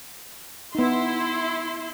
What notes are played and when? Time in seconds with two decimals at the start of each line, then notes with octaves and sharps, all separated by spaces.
0.75 B3 D#4 E4 C6